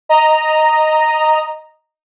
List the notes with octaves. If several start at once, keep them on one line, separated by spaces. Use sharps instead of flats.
D#5 A#5